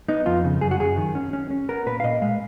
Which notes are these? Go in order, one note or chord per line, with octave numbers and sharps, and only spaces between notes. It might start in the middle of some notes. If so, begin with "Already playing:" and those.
B3 D#4
F2 F4
C#3
F#2 G#4
F#4
F#2 G#4
D#3
C#4
C#4
C#4
B3 A#4
A#2 B4
F5
A#2 D#5
G#3 F5